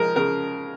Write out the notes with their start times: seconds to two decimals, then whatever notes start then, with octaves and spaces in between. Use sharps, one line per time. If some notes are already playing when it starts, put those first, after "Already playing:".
Already playing: F3 G#3 A#4
0.16 C#3 A#4